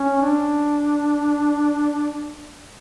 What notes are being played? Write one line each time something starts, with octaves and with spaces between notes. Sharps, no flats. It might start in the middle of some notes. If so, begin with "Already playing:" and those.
Already playing: C#4
D4